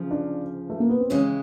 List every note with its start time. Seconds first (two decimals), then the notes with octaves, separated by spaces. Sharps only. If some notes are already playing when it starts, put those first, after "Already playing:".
Already playing: D2 C#3 F3
0.11 D4
0.70 A3
0.80 A#3
0.89 B3
1.00 C4
1.10 D#2 C#3 E3 G#3 C#4